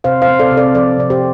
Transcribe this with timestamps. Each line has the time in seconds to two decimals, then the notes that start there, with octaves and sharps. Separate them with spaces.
0.04 C3 C5 F5
0.22 C5 F5
0.28 C4
0.40 A4 D5
0.52 C3
0.57 A4 D5
0.74 F3 A4 D5
0.98 C3 D5
1.10 G4 C5